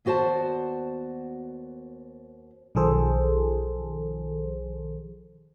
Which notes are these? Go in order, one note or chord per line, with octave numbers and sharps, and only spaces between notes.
D#2 B3 F#4 C5 D5 A5
B1 D#3 F3 G#4 A4 C5